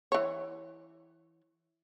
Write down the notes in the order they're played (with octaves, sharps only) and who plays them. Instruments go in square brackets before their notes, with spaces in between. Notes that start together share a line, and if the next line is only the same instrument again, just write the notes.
[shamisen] E3 C#5